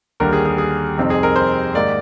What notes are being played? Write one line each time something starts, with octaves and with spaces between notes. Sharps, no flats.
D#2 D3 G3 A#4
G#4
G#4
G#4
F2 C3 G3 C4 D#4
G#4
A#4
C5
G#2 D#3 A#3 D#4 D5